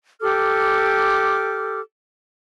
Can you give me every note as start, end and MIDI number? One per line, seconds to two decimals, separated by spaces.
0.21 1.80 67
0.21 1.80 69
0.21 1.80 86
0.21 1.80 89